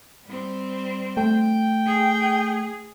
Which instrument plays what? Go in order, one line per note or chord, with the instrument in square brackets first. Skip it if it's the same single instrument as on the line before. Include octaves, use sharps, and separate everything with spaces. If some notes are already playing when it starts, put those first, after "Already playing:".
[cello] G3 C4
[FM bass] A3 [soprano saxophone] G5
[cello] G#4